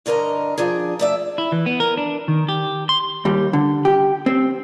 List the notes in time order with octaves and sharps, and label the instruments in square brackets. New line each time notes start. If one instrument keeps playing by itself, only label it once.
[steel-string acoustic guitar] G2 D3 A#4 D#5 A#5
F3 D4 G#4
A3 D5 E5
[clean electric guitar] E4
E3
B3
A#4
D4
D#3
G4
C6
[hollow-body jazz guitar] D#2 G3
D3
G4
C4